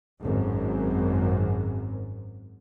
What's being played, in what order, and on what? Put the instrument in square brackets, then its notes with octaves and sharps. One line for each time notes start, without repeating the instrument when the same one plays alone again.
[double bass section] G#1 F#2